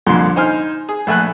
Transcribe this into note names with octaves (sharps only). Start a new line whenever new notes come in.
C2 F2 A#2 D3 C6
D#4 C5 G#5 C6 F6
G#4
A#1 A3 G#5 F#6